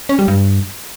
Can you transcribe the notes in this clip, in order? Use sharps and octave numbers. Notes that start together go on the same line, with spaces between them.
C#4
G3
G2